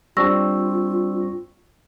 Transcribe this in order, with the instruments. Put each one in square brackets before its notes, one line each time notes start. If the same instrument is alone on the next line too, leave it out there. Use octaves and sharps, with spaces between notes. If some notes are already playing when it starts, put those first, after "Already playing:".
[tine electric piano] G3 C4 D4 [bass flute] F4 [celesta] C#6 E6 A#6